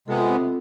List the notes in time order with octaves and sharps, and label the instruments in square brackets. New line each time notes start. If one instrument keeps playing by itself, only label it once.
[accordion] C3 G#3 B3 [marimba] F4 A4
[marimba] F4 A4
C4